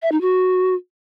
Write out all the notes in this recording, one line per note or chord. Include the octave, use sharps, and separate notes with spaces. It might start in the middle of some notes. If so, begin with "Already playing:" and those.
E5
D#4
F#4